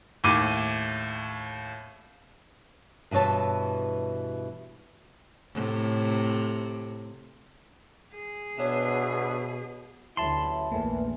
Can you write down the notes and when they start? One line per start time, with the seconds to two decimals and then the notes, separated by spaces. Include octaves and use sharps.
0.24 D#2 A2 D6 D#7
3.11 G2 B2 E3 C#5 A5
5.54 A2 C3
8.14 G#4
8.57 B2 B3 D4 C5 C#5 E5 A5
10.17 A1 D2 F#3 E4 A5 B5 C6
10.72 A#1 E2 E3 A3 A#3